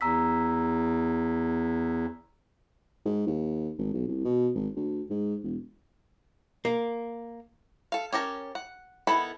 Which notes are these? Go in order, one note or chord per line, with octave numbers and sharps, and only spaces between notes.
E2 A#5 E6 B6
G#2
D#2
G#1
B1
C2
B2
G#1
D2
G#2
E1
A#3
A4 F5
C#4 G4 A#4 A5
F#5
D#3 B3 E4 A4 B5